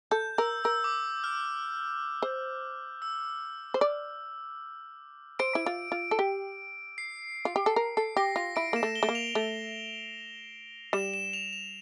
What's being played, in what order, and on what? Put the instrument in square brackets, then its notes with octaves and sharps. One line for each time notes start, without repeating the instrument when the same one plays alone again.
[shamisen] A4 [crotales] G6
[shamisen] A#4 [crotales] E6
[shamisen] A#4 [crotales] E6
[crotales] D6
F6
[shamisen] C5
[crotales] E6
[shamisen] C5
D5
[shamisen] C5 [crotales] D7
[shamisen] E4
F4
F4
A4
G4
[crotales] C7
[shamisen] F4
G4
A4
A#4
[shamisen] A4 [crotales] C7
[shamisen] G4 [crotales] A#6
[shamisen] F4 [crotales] A#6
[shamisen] E4 [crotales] D7
[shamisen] A#3 [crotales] E7
[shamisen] A3
[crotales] G7
[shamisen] A3
A#3
[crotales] F7
[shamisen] A3
[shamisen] G3 [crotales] E7
[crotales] E7
F7
F7